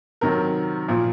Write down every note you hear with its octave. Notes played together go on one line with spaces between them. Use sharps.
C3 D#3 F#3 A#4
A#2 F3